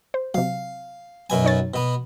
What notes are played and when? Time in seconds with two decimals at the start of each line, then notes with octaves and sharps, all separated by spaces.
0.14 C5
0.34 C3 F#3 F5
1.30 F#2 B2 G#5
1.44 D#4 C#5 A6
1.74 B2 B3